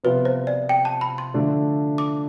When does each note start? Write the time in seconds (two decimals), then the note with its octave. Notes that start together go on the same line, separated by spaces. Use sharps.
0.04 C3 F3 B3 F4 B4
0.25 C5
0.47 D5
0.69 G5
0.85 A5
1.01 B5
1.18 C6
1.34 D3 F3 A3 D4
1.98 D6